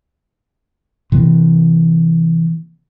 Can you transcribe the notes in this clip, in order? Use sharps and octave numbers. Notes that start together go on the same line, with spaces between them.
C3 E3 A#3